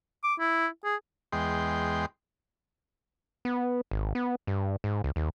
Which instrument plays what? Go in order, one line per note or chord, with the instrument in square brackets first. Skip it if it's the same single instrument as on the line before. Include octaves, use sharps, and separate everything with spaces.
[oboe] D6
E4
G#4
[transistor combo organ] E2 G#3 G5 C6
[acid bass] B3
G#1
B3
G2
G#2
C#2
D#2